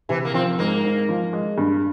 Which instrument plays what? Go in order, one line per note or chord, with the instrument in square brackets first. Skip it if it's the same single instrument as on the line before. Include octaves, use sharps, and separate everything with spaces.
[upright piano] C3 [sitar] E3
[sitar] A#3
[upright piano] F3 [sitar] C4
[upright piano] G#2 [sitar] A#3
[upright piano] G#2
F3
G#3
G2